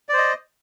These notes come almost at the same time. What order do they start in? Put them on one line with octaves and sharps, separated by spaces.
D5 C5 D#5